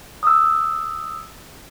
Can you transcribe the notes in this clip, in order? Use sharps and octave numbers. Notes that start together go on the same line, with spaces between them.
D#6 E6